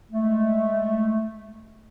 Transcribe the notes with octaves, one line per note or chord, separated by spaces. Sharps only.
G#3 A3